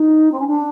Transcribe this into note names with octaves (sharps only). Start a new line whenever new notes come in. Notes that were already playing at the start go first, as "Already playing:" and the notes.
Already playing: D#4
C4
C#4
D4